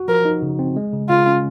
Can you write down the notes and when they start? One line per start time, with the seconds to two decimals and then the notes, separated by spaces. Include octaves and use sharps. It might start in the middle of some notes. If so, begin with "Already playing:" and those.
Already playing: F#4
0.08 F3 A#4
0.25 D#4
0.43 C#3
0.59 C4
0.76 G#3
0.93 C#3
1.09 C#3 F4
1.27 C#4